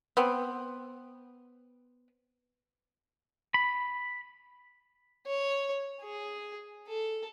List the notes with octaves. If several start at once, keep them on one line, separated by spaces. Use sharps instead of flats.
B3 C4
B5
C#5
G#4
A4